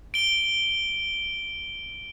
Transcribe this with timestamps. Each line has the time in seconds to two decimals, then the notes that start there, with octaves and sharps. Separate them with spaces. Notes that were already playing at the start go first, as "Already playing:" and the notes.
0.14 D7 G7